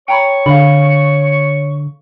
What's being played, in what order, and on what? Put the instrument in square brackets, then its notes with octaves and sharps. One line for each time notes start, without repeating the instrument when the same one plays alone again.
[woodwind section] C#5 C#6 [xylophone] G5 A#5 B5
[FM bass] D3 [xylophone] F5 B5